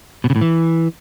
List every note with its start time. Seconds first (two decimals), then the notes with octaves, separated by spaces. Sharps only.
0.24 B2
0.30 C#3
0.36 A2
0.41 E3